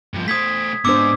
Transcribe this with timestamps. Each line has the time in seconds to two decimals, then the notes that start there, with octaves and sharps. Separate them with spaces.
0.14 G2 F3
0.28 A3 C5 D#6 G#6 B6
0.85 G#2 B3 D4 C5 D6 E6